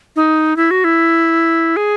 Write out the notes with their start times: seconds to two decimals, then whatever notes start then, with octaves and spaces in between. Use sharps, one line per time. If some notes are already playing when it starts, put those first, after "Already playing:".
0.16 D#4
0.56 E4
0.71 F#4
0.84 E4
1.76 G#4